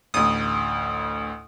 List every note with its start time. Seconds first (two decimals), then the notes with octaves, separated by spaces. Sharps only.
0.14 A1 D2 D#6